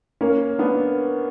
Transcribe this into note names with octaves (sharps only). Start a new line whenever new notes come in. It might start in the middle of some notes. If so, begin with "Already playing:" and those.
A#3 C#4
B3 D4